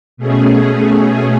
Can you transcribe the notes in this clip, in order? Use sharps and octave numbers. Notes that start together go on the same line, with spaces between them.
B2 A3 C#4 G#4